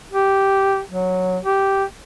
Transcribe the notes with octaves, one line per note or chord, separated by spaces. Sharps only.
G4
F#3
G4